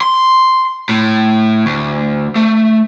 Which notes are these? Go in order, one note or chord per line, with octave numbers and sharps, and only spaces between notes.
C6
A2
D2
A3